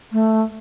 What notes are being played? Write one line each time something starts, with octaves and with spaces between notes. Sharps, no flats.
A3